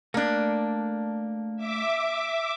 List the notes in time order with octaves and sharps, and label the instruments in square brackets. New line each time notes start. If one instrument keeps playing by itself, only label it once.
[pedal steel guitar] A3 F#6 [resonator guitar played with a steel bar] A#3 D4
[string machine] E5 D6